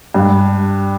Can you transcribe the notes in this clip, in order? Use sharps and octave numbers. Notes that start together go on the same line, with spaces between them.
G2